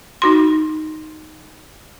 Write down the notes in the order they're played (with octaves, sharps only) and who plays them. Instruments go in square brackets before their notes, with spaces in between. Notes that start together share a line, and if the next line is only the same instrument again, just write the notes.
[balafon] D#4 F#4 C6